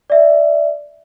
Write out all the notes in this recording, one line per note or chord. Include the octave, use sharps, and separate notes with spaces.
D5 E5